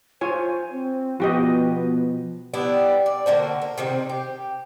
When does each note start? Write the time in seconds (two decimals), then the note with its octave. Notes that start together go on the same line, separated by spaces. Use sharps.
0.21 F4 C5 C#5 G#5
0.71 C4
1.20 B2 F3 B3 F#4 G4 D#5
2.54 B3 D4 E4 G4
3.06 D5
3.26 D3 A#3 F#4 C5
3.62 A#4
3.78 C3 D#3 C4
4.09 G4